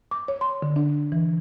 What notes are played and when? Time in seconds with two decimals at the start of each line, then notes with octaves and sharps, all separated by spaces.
0.11 D6
0.28 C#5
0.41 C6
0.62 D3
0.76 D4
1.12 E3